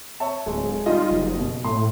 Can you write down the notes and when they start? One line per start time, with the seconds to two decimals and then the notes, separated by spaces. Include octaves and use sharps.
0.20 C#5 E5 A5
0.46 D1 G#3
0.86 G3 D#4 F4 D#5
1.11 F#1
1.39 B2
1.64 A2 C6